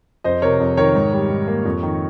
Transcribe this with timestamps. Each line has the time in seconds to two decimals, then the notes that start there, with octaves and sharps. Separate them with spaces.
0.24 F2 C5 D#5
0.42 C3 A#4 C#5
0.60 F2
0.77 D#3 A#4 C#5
0.95 G#2
1.12 G3
1.30 G#2
1.48 A#3
1.65 F2
1.83 D#3